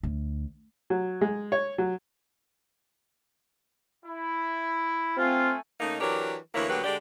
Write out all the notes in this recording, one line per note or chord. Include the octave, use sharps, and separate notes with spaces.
D2
F#3
G#3
C#5
F#3
E4
A3 C4 F4 G#5
C#3 A3 A#3 D#4
E3 F#3 D4 G4 A#4 C#5
D2 E3 A#3 E4 A#4 C#5
D2 D3 F#3 A#3 G4 B4
D3 G#3 G4 D5